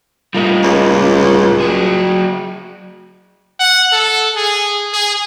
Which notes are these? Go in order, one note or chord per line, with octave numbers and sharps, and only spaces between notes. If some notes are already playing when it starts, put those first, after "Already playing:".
A2 G3 F4 A#4 D#5
C#2
F#3 G#4
F#5
A4
G#4
G#4